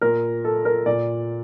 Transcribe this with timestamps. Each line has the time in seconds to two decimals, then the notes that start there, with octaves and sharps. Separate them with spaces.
0.01 A#2 A#4
0.44 A4
0.65 A#4
0.86 A#2 D5